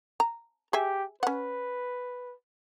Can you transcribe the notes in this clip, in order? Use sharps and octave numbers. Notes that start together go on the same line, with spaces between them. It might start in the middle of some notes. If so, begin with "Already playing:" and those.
A#5
G4 G#4 E5 G#5
C#4 B4 F#5